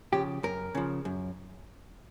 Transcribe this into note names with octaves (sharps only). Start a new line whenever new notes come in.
C#3 F3 G4
F#2 A#4
C#3 F3
F#2